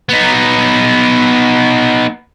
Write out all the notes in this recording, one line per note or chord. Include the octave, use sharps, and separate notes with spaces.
B3 D#4